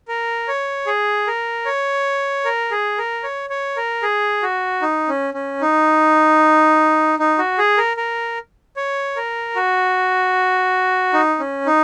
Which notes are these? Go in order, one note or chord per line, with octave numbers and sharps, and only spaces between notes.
A#4
C#5
G#4
A#4
C#5
A#4
G#4
A#4
C#5
C#5
A#4
G#4
F#4
D#4
C#4
C#4
D#4
D#4
F#4
G#4
A#4
A#4
C#5
A#4
F#4
D#4
C#4
D#4